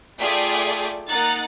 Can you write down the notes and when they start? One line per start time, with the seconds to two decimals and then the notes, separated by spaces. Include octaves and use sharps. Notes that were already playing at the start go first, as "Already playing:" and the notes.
0.19 A3 F4 G#4 D5 G5 B6
1.09 A#3 D#4 F#5 A#5 F#6 A6